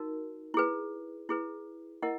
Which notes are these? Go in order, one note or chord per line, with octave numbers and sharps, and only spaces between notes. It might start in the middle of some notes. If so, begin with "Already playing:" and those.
Already playing: D#4 F#4 A#4
E4 G#4 B4
E4 G#4 B4
E4 A#4 D#5 F#5